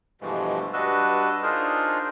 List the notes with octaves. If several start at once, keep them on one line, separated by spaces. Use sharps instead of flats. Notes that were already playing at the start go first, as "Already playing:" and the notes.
G2 B2 E3 F3 G#3 A3
G2 D4 F#4 B4 D#5 E6
D4 D#4 F4 G#4 A#4 C5